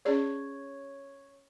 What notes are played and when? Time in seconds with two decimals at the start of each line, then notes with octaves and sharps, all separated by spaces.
0.05 C#4 G#4 C#5 D5